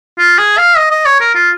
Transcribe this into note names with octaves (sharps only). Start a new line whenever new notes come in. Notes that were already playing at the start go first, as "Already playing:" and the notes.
F4
G#4
F5
D#5
D#5
C#5
A#4
F4